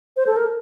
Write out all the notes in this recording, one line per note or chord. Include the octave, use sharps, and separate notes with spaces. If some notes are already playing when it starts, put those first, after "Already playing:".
C5
A4
A#4